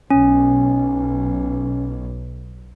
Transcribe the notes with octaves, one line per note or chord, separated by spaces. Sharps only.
B1 C#4